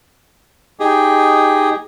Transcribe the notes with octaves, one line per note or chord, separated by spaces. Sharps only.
D#4 G4 G#4